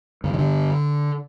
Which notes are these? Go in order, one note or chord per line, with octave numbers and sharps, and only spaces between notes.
G2 D3
D#3
D3